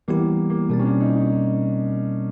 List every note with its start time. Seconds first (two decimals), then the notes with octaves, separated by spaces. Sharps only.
0.08 E3 G3 A#3 B3 E4 G4
0.50 A#3
0.70 B2 G3 A#3 C4
0.79 C#4
0.85 D4
1.00 D#4
1.15 D#4